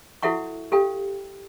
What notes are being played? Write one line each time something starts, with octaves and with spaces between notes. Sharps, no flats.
E4 F#4 A4 E5 F#5 C#6
G4 A4 F5 G5